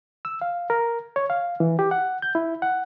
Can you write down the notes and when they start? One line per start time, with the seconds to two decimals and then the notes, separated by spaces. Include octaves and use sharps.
0.25 E6
0.41 F5
0.70 A#4
1.16 C#5
1.30 F5
1.60 E3
1.79 G4
1.91 F#5
2.22 G6
2.35 E4
2.62 F#5